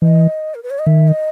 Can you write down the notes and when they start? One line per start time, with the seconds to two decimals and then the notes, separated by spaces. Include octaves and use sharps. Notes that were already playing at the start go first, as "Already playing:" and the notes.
0.02 E3 D#5
0.55 A#4
0.63 B4
0.70 C#5
0.79 D#5
0.86 D#3 E5
1.08 D#5